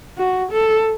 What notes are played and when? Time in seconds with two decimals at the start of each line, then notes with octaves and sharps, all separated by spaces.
0.18 F#4
0.52 A4